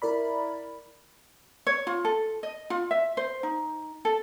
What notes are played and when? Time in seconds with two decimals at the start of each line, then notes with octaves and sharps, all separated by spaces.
0.02 E4 A#4 D5 B5
1.67 C#5
1.87 F4
2.05 A4
2.43 D#5
2.70 F4
2.91 E5
3.17 C5
3.43 D#4
4.05 A4